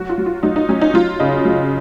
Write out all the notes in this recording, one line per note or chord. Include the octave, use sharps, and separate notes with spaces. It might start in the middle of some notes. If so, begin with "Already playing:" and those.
Already playing: F#3 F#4
F4
F#3
F4
F#3 D#4
D#4
F#3 C#4
D#4
F#3 F4
C#3 D#5
F#3